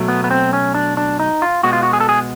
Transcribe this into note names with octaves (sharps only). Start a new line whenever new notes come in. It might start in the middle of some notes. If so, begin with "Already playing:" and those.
Already playing: B2 F#3 A3
B3
B3
C4
C#4
D4
D4
D#4
F4
B2 G#3 B3 F#4
F4
F#4
G#4
A4
G#4